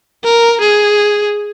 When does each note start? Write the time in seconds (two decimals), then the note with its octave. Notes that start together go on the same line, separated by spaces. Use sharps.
0.24 A#4
0.61 G#4